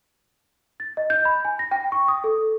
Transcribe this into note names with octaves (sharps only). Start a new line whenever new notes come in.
A6
D#5
G6
B5
G#5
A#6
G5
C#6
D#6
A4